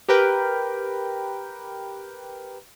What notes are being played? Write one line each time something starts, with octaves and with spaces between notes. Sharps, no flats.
G4 A#4 B4 G5